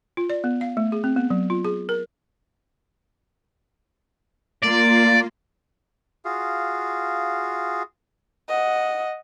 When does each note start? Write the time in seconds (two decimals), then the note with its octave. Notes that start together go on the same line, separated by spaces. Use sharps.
0.17 F4
0.30 D5
0.44 B3
0.61 F5
0.77 A3
0.92 G#4
1.04 C4
1.16 B3
1.31 F#3
1.50 F4
1.65 G#4
1.89 A#4
4.63 A#3 F4 D5
6.25 F4 F#4 G#4 F5
8.48 D#5 F#5